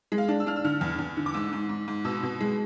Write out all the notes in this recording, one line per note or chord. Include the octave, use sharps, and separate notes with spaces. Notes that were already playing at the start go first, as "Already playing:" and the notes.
G#3
F5
D4
E6
D4 F6
E6
D3 F6
E2
E2
D3
D6
G#2 E6
G#2
G#2
G#2
B2 E6
B2
G#3